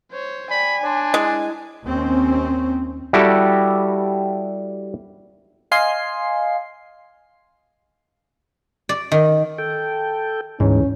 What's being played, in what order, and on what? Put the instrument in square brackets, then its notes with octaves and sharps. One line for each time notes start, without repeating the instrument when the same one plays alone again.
[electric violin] C5 C#5
[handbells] D5 G5 [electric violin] G#5 [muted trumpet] B5
[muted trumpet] D4 [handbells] C#5 A5 C6
[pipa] G#3 [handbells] E4
[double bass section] D#2 C4 C#4
[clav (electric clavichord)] G3 E4 F#4 G4 A4
[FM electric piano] D#5 F5 G#5 C6 C7
[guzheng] D5
D#3
[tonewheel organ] A4 G5
[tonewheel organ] D2 E3 [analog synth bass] G#2 [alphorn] C#4